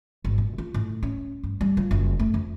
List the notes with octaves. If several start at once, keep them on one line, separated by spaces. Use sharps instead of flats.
G#1
A#2
F4
A2
C#4
G2
G3
F4
F#1
A3
F2